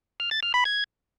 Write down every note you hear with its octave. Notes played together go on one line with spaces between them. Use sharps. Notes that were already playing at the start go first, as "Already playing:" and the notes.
F6
A6
F6
B5
G#6